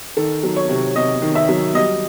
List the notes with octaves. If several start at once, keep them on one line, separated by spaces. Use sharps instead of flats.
D#3 A4
F#3
C#5
C3
C3 D#5
D#3
E5
F#3
G3 D#5